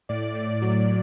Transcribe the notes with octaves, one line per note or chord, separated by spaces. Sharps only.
A2 D5
A2
F#3